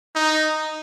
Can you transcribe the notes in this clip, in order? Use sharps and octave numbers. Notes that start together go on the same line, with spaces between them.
D#4